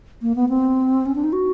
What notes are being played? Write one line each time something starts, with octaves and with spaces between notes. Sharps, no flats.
A#3
B3
C4
C#4
D4
D#4
F#4